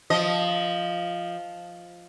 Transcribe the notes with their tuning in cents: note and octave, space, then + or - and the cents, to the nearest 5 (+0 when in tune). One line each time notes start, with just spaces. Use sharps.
F3 +0 D#5 +0